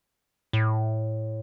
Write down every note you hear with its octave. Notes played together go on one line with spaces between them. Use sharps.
A2